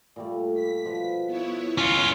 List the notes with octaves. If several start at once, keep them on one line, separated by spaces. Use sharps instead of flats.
A#2 G3 A3
B6
B2 F3 B4
B3 E4 C#5
C#4 F4